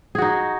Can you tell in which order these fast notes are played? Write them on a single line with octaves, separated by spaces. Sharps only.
G#4 F#4 D#4